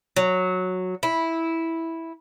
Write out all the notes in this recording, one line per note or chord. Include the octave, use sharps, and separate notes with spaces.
F#3
E4